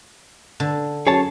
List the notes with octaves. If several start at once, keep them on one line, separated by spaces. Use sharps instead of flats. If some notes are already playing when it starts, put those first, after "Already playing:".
D3
F#2 G#4 C#5 A5